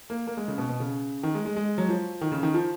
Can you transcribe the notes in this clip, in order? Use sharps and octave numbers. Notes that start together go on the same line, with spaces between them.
A#3
A#3
G#3
C#3
B2
B2
C#3
D#3
G#3
G#3
G#3
F#3
F3
D#3
C#3
D#3
F3